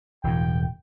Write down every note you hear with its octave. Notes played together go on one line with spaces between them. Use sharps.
E1 A2 G5